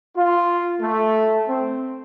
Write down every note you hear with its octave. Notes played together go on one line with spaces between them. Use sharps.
F4
A3
C4